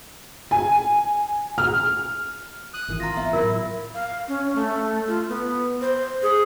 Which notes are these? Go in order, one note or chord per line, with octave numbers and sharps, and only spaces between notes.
G#5
F6
D#6 F#6
G#1 D#3 E3
F4 A#5 A#6
B3 C4 E5
A2 F#3 E4 F4 A#4
F5
C#4
A3
F4
B3
C5
G#4